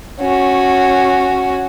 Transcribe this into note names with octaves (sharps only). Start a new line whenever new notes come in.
C#4 F#4